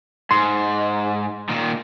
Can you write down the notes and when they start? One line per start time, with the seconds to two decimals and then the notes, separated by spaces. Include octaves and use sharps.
0.31 G#2 C6
1.49 A#2 D#3